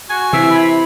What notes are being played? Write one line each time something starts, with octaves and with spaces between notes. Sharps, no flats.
F#4 G#5
C3 E3 E5
B5